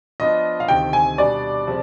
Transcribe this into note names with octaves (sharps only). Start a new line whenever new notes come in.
F3 B3 D4 F4 B4 D#5
F5
D2 C3 D#3 G5
G#5
B2 G3 D4 D5
C3 F3 G#3